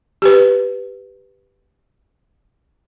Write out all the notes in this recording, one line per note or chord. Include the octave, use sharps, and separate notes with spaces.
G4 B4